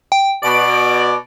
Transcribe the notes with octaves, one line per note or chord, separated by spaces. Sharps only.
G5
B2 D5 D7